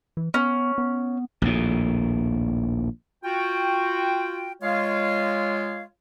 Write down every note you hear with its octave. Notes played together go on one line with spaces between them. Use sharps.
E3
B3 C#4
B3
A#1 D#2 A2
F4 F#4 G5
G#3 F4 C#5 F5